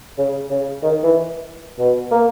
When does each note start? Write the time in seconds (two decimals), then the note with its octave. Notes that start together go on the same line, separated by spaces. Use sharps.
0.18 C#3
0.50 C#3
0.83 D#3
1.04 E3
1.79 B2
2.11 A#3